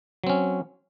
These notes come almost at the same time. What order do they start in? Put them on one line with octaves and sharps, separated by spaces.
F#3 C4 C#4